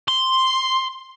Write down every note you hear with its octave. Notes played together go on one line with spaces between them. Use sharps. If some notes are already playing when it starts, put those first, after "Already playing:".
C6